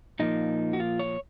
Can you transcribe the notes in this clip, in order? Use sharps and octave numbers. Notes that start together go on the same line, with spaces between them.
A#2 F3 A#3 D#4
F#4
F4
C#5